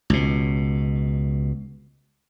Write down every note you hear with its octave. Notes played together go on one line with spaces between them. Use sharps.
C#2 B2